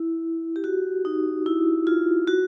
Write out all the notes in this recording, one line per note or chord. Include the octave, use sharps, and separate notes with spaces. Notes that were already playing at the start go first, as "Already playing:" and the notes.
Already playing: E4
G4
F#4
D#4
E4
F4
F#4